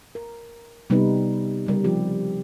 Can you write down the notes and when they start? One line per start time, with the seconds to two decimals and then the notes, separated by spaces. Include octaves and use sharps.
0.15 A#4
0.90 C3 G3 B3 D#4 B4
1.67 C#3 G3 A#4
1.84 F3 C4 G4